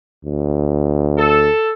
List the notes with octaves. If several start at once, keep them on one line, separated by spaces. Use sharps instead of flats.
D2
A4